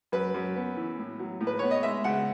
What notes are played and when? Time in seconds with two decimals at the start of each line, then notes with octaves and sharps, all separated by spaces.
0.12 F#2 B4
0.34 F#2
0.56 B3
0.77 E3
0.99 A2
1.19 F#3
1.41 A2
1.47 B4
1.59 B3 C#5
1.71 D#5
1.83 G#3 E5
2.04 C#3 F#5